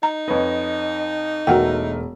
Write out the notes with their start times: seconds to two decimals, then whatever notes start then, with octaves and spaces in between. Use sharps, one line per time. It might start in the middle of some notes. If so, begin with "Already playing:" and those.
0.03 D#4 A#5
0.28 F2 B4 C#5 D#5
1.47 E1 A3 F#4 A#4 F#5 G5